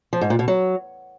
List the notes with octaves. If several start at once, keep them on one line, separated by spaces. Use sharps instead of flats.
F3
G#2
A#2
B2
F#3